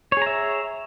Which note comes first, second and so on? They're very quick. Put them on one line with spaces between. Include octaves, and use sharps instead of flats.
C#5 G#4 A#5 E5